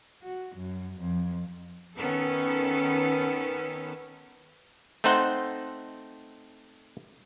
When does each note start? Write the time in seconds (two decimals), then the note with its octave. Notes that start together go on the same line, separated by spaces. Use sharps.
0.23 F#4
0.55 F#2
0.98 F2
1.97 D#3 B3 C#4 A4
5.04 A3 C4 D#4 C5 F#5